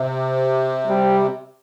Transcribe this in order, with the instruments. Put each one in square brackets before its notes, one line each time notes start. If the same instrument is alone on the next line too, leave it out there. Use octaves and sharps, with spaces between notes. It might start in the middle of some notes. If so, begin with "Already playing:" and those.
Already playing: [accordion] C3
[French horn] G3